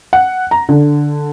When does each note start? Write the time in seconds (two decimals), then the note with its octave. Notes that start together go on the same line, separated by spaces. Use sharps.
0.13 F#5
0.51 A#5
0.69 D3